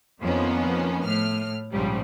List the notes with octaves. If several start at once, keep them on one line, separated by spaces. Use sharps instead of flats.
F2 D#3 F3 A#3 B3 C#4
A2 F6
A#1 G#2 C#3 F3 G3